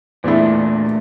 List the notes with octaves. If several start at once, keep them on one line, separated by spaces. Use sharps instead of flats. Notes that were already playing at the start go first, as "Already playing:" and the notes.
E2 A#2 A3 D4 E4